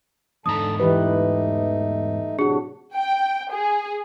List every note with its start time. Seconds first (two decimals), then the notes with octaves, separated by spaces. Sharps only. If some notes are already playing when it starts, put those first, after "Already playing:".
0.46 E2 G#2 D3 A5 A#5 D#6
0.80 E3 A3 D#4 G4 B4
2.39 A2 C3 F#3 D4 F#4 G#4
2.94 G5
3.51 G#4